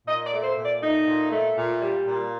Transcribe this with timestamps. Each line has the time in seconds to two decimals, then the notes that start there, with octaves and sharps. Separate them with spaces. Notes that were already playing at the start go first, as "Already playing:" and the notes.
0.06 A#2 D#5
0.26 D5
0.31 A3
0.44 C5
0.56 A#2
0.63 D5
0.81 A3 D#4
1.07 A#2
1.31 A3
1.57 A#2
1.81 G3
2.07 A#2